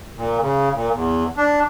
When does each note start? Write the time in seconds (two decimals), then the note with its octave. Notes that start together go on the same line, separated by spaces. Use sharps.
0.17 A#2
0.41 C#3
0.75 A#2
0.94 E2
1.37 D4